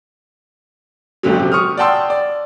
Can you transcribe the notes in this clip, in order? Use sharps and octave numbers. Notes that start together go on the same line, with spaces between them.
G#1 F2 A#2 D3 F#3
C3 F#3
C#6 D#6 F6
D5 F#5 G5 A5 C6 E6
D5